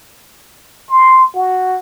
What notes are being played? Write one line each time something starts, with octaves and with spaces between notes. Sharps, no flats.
C6
F#4